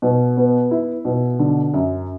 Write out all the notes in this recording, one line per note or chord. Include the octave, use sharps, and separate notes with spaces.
B2
B3
E4
B2
D3
F#2